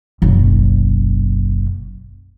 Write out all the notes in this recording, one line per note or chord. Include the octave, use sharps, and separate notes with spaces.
F#1 B1